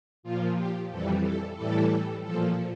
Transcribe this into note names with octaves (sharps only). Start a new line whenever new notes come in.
A#2 F3 F4
G4
F2 E3 G3 A4
A4
A2 E3 G3 A4
A#2 F3 A4